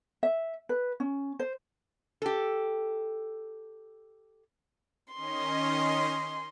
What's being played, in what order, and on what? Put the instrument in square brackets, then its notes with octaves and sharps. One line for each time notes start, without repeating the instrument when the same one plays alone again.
[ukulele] E5
B4
C#4
C5
[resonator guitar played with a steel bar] G4 A4
[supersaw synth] D#3 C#4 D#5 [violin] C6